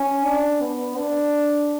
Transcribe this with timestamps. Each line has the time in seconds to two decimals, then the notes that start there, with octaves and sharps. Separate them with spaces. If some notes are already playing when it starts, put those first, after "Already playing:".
Already playing: C#4
0.24 D4
0.61 B3
0.97 D4